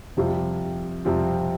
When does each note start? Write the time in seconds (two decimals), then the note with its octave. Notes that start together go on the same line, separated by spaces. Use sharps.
0.17 F2 C3 G3 C4 F4
1.05 F2 C3 G3 C4 F4